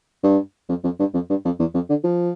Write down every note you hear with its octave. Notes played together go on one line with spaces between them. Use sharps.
G2
F2
F2
G2
F2
G2
F2
E2
F2
D3
F3